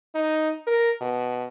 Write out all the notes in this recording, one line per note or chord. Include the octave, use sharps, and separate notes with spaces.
D#4
A#4
B2